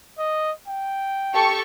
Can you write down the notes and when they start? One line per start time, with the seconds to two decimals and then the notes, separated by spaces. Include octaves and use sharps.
0.19 D#5
0.68 G5
1.34 G4 A4 C#6